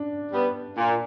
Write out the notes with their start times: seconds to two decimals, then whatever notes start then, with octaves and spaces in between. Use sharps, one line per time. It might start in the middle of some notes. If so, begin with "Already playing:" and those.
Already playing: D4
0.32 G3 B3
0.77 A#2